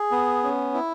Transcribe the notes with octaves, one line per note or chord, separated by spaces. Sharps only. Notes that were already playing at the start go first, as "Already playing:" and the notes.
Already playing: G#4
B3
C#4
E4